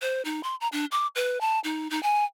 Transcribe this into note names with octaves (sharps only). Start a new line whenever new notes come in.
C5
D#4
C6
A#5
D4
D6
B4
A5
D#4
D#4
G#5